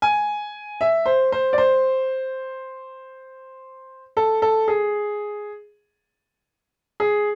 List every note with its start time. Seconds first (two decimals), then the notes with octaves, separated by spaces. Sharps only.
0.02 G#5
0.81 E5
1.06 C5
1.32 C5
1.53 D5
1.58 C5
4.17 A4
4.42 A4
4.68 G#4
7.00 G#4